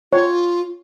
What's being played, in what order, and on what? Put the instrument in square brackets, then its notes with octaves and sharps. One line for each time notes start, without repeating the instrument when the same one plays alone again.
[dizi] F4 [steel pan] C#5